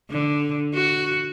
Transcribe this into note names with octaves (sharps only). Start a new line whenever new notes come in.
D3
F#4